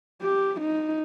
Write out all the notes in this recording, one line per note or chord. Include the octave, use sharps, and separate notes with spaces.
G4
D#4